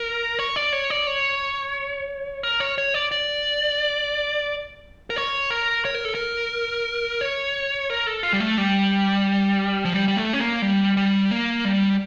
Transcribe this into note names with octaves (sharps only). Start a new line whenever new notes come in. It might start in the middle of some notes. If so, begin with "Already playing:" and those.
Already playing: A#4
C#5
D5
C#5
D5
C#5
A#4
C#5
C#5
D5
D5
A#4
C#5
A#4
C#5
A#4
A4
A#4
C#5
A#4
A4
F4
G3
A3
G3
F3
G3
G3
A3
C#4
A#3
G3
G3
A#3
G3